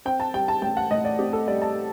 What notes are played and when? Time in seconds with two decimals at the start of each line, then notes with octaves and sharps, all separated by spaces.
0.05 C4 G5
0.20 A5
0.33 G3 G5
0.48 A5
0.62 A1 G5
0.77 F#5
0.91 A2 D#5
1.05 D5
1.19 C4 G4
1.33 A4
1.47 G3 D5
1.62 A5